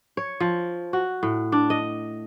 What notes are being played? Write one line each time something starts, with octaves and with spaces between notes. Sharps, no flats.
C#5
F3
F#4
A2
D4
D#5